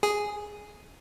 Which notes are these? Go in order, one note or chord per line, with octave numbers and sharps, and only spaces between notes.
G#4